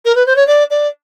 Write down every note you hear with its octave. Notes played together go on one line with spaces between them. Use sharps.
A#4
B4
C5
C#5
D5
D5